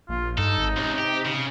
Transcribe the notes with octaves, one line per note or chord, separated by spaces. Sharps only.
A#1 F4
G2 D#4 A4
G#1
C#2 C3
G4
C#3